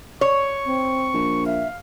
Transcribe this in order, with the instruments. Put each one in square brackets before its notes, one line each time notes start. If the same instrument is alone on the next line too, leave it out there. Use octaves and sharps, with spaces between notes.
[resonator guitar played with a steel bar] C#5 [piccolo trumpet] C#6
[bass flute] C4
[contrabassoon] A#1
[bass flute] E5 [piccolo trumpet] F5